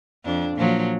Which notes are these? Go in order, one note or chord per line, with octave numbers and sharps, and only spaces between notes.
F2 D4
A#2 F3 F#3